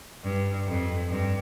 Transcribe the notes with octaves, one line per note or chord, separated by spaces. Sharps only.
G2
F2
G2